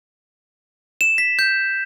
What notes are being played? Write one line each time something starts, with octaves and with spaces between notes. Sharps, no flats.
E7
B6
G6